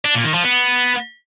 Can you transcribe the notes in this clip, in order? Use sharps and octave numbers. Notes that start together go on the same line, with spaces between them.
D4
A#2
D#3
F3
B3